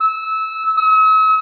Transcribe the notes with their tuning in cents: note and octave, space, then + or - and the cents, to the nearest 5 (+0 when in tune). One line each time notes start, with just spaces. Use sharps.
E6 -20
E6 -45